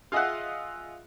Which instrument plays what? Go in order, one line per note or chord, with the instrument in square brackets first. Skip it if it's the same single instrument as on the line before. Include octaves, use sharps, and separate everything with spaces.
[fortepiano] F4 G#4 D#5 E5 F#5